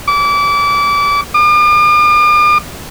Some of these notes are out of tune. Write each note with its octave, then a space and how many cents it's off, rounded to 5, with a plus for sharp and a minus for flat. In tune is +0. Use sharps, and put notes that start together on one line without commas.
D6 -30
D6 +45